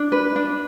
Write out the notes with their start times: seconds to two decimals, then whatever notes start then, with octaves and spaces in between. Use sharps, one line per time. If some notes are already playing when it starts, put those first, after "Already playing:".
Already playing: D4
0.12 B4
0.36 D4